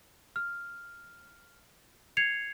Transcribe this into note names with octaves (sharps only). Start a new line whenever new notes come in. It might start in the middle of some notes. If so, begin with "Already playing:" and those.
F6
G#6 C7 C#7 F7